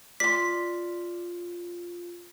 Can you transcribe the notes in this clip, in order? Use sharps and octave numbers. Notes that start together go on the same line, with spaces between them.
F4 D5 C6 B6